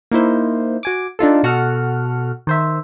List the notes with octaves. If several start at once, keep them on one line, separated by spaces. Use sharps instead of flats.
A#3 D#4 E4 C5
F#4 G#5 D6
D4 D#4 F4 A4
B2 F#4 A4 F#5 F6
D#3 C5 E5